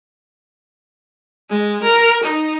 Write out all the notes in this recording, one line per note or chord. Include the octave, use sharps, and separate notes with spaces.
G#3
A#4
D#4